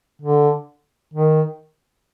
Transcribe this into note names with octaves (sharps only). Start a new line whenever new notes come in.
D3
D#3